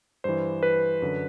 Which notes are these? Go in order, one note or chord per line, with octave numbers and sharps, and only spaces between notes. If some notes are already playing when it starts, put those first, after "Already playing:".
G2 E3 C5
B4
F#2 D3